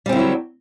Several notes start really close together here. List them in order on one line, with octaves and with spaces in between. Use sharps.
G3 C4 D3 E4 F#3